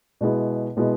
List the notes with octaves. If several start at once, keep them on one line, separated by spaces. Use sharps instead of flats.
B2 G#3 B3 E4
B2 G#3 B3 E4